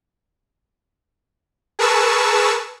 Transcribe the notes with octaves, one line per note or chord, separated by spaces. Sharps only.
G#4 A#4 B4 A5 C#6 E6